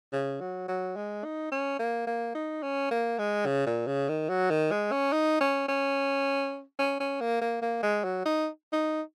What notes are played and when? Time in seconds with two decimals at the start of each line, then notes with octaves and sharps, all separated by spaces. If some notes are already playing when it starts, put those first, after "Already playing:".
0.13 C#3
0.40 F#3
0.68 F#3
0.96 G#3
1.24 D#4
1.52 C#4
1.79 A#3
2.07 A#3
2.35 D#4
2.63 C#4
2.91 A#3
3.18 G#3
3.46 C#3
3.66 A#2
3.87 C#3
4.09 D#3
4.29 F#3
4.50 D#3
4.71 G#3
4.92 C#4
5.12 D#4
5.40 C#4
5.68 C#4
6.79 C#4
7.00 C#4
7.20 A#3
7.41 A#3
7.62 A#3
7.83 G#3
8.04 F#3
8.25 D#4
8.73 D#4